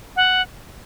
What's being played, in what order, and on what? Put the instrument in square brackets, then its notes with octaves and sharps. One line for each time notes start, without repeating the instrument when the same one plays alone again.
[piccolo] F#5